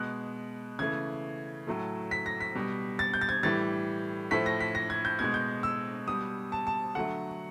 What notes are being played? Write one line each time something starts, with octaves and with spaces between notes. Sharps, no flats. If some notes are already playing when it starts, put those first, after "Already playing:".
Already playing: B2 G#3 F#6
C#3 E3 A3 G#6
A2 F#3 A3
B6
A#6
B6
B2 G3
A6
G6
A6
G#6
A2 E3 G3 A6
A2 F3 A3 B6
A#6
B6
A#6
G#6
G6
B2 G#3 G#6
G6
E6
B2 G3 D#6
A5
A5
D3 F#3 A3 F#5